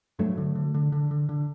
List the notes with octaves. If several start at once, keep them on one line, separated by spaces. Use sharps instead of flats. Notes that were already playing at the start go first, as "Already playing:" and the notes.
G2 F#3 A3
D3
D3
D3
D3
D3
D3